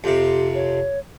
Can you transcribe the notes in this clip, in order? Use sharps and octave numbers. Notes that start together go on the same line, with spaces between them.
F2 C3 G4
C#5